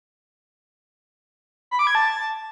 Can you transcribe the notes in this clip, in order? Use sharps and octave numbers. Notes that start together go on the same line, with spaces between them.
B5
D6
G#6
A5